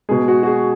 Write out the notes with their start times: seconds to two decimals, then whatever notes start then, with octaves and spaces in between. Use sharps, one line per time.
0.09 B2 G#3 G#4
0.28 F#4
0.43 F#4
0.46 G#4